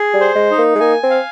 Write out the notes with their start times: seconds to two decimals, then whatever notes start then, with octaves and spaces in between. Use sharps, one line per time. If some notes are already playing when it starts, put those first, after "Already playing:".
Already playing: G#4
0.14 G3
0.21 C5
0.35 G#3
0.51 D#4
0.58 A#3
0.75 G#3
0.80 A#3 G#5
1.03 C4
1.10 F5